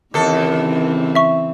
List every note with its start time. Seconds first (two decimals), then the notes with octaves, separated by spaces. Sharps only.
0.14 D#2 C#3 E3 C4 A4
1.15 E5 C#6